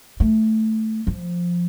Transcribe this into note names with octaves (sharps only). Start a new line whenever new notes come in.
A3
F3